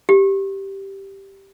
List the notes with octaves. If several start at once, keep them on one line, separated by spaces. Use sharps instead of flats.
G4